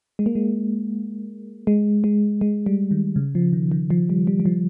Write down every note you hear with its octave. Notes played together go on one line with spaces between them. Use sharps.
G#3
A#3
G#3
G#3
G#3
G#3
G3
D#3
C#3
F3
D#3
D#3
F3
G3
G3
G3
F3